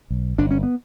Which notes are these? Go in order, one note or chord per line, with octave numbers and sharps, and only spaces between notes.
B1
G1 D4
C#4
B3